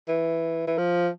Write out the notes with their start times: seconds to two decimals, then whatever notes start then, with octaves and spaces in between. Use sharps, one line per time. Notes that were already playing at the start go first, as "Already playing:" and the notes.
0.09 E3
0.67 E3
0.78 F3